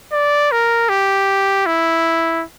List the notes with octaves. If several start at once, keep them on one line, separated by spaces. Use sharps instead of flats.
D5
A#4
G4
E4